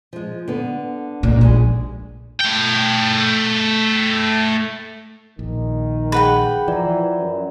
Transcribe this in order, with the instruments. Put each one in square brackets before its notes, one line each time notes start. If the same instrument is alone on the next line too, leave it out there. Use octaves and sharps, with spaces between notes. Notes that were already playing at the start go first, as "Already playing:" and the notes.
[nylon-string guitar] F3 G#3
D3 B3
[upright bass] A#2 [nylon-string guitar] D4 D#4
[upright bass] A#1 [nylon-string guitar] G3 G#3 G#4
[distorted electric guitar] A3 G5
[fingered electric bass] A#1 [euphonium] D#3
[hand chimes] G#4 [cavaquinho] B4 F#5 G5
[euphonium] E3 [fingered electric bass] F3 [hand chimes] D5 A#5
[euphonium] F#2